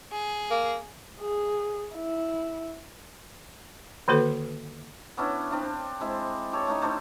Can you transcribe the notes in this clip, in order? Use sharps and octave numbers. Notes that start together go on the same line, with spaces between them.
G#4
A#3
G#4
E4
D3 D#3 A#3 F#4 A4 B4
B3 C#4 D4 E4
C4 D4 F5
G#3 C4 E4
G4 A4 C#5
A3 C#4 D#4
A3 D4 E4 C5